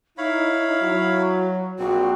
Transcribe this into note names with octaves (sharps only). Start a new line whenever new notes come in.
D#4 E4 C#5 F5 B5
F#3 F#4
A#1 C4 F#4